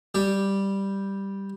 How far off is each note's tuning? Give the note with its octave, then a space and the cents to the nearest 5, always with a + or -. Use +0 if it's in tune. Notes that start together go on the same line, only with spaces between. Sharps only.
G3 +0 G4 +0